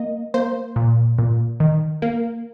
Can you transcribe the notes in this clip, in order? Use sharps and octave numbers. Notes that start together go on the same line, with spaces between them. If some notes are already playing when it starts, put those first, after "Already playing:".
Already playing: A#3 D#5
A#3 C5
A#2
A#2
D#3
A#3